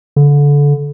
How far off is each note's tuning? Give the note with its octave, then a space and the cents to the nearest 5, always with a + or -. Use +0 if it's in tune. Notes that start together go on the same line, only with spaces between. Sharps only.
D3 -25